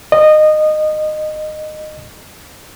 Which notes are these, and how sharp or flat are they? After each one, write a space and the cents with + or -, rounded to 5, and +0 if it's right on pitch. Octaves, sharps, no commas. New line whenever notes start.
D#5 -20